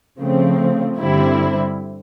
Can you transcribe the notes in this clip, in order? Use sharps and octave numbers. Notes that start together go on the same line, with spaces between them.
C#3 F3 A3 C4
G2 D3 G3 C4 E4